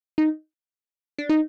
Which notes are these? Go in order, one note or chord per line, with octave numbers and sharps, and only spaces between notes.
D#4
D4
D#4